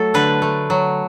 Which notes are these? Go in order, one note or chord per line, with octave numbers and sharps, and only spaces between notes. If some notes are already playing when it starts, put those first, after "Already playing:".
Already playing: F#3 A3 A4
D3 B4
A3
F#3